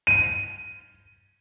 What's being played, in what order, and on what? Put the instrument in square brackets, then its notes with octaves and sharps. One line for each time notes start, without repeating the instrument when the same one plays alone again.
[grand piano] D#7